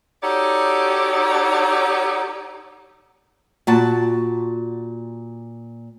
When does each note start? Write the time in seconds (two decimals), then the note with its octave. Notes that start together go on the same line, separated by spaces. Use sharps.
0.22 D#4 F#4 G4 A4 C#5 D5
3.67 A#2 F#4 A5